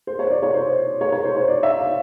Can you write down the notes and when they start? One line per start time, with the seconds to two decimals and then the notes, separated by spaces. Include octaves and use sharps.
0.07 C5
0.19 C#5
0.30 D5
0.43 C#5
0.54 C5
1.01 C#5
1.12 C#5
1.24 C5
1.36 C#5
1.48 D5
1.63 E5
1.79 F5